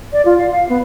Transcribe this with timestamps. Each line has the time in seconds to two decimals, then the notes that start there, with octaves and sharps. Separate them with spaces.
0.13 D5
0.25 F4
0.38 F5
0.51 F5
0.69 B3